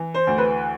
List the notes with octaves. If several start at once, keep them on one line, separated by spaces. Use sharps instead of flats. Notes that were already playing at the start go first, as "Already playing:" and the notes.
Already playing: E3
C5
D2
B4